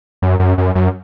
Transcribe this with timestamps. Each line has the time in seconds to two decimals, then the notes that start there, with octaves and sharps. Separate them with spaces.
0.22 F#2
0.39 F#2
0.58 F#2
0.75 F#2